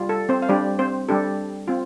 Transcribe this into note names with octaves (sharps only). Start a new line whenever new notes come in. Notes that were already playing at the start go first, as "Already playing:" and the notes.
Already playing: G3 F4
A4
C4 C5
F5
G3 D4 G4 D5
C4 C5
G3 D4 G4 A4
C4 F4